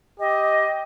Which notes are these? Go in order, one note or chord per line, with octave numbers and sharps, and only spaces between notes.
G4 D#5